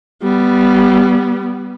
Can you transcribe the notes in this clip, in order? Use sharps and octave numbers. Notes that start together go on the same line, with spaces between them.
G3 B3